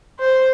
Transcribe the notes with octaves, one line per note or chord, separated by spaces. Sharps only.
C5